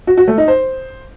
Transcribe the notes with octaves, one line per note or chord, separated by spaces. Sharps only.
F#4
F#4
A3
D#4
C5